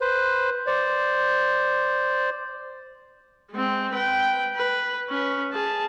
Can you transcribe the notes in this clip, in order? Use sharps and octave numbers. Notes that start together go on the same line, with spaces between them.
B4 C5
C5 D5
G#3 C4
B4 G5
B4
C#4 B4
G#4 A5